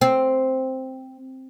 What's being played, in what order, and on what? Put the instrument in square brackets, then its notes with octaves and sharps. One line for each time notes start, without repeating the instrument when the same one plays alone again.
[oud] C4